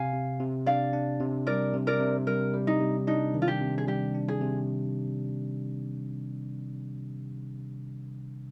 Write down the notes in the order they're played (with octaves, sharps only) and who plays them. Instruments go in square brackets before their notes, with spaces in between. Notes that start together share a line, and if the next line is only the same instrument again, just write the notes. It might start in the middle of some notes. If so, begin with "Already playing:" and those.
Already playing: [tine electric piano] C3 [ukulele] F5 G#5
[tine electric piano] C3
C3
[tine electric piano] D4 [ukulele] D5 F5
[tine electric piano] D4
C3
[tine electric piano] G3 [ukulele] A#4 D5
[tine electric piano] C3
[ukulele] A#4 D5
[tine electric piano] C3
[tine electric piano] G3 [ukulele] A#4
[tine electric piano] G3
[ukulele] D#4
[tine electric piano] C3
[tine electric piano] D4 [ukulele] D#4
[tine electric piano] D#3
[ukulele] F4
G4
[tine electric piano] C3
[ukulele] G#4
[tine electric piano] G3 [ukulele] G4
[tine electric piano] D4
[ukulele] G#4
[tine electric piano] C3